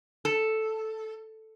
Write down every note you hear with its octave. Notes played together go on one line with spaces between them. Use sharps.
A4